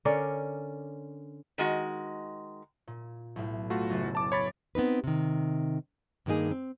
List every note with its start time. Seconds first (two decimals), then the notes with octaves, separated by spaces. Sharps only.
0.05 D3 C#4 A#4 D5
1.58 D#3 G#3 F#4
2.87 A#2
3.36 B1 A2
3.70 A3 F4 F#4
3.90 F#1 A6
4.15 A5 D6
4.32 C#5 B5 A6
4.75 B3 C4 D#4 B4
5.04 C3 D#3
6.26 G2 D#3 G#3 A#3 D#4 G#4
6.51 C4